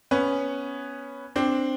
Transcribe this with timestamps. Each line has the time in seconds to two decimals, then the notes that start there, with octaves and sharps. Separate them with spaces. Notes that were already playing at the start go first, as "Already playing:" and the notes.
0.11 B3 C#4
1.36 C4 D4